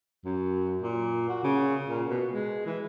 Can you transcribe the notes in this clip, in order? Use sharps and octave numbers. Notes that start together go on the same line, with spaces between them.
F#2
A#2
F#4
C#3
A#2
B2
G#3
E3